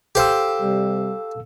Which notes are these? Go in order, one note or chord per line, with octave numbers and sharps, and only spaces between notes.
G4 A4 C5 F5 E6
C3 G3